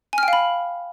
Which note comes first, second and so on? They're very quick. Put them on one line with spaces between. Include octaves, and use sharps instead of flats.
G#5 F6 G5 F5 B5